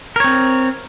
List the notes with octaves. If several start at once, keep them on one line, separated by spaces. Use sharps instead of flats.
C4 A#4 C#5